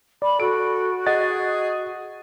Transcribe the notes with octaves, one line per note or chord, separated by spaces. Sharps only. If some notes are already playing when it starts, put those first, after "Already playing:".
D5 B5
F#4 A4 D7
G#4 D#5 F#5 A6